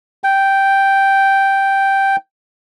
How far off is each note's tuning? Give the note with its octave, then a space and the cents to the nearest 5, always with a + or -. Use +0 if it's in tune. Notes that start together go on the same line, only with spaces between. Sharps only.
G5 -5